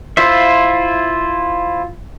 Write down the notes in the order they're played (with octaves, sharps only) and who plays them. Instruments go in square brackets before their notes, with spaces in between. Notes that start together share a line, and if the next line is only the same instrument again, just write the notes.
[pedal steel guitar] E4 F4 C5 E5